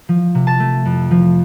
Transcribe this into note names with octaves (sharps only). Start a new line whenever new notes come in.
F3
C3
A5
A3
F2
F3